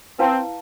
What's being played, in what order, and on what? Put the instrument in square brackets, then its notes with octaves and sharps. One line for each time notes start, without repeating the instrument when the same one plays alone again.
[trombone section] C4 [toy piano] E4 B4 F5 A5